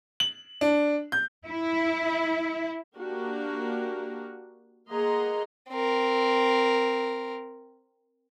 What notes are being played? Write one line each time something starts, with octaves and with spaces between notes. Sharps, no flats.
F#7
D4
G6
E4
A#3 D4 F#4 G4 A#4
A#3 G#4 D#5 F#5 A#5 C6
C4 A#4